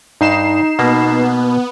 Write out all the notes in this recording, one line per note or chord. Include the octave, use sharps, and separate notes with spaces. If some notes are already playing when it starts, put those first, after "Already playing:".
G2 D#4 C7 E7
B2 A#3 B3